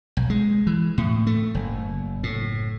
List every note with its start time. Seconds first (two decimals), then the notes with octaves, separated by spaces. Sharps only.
0.17 B1
0.30 G#3
0.67 E3
0.98 A2
1.27 A3
1.55 F#1
2.23 A2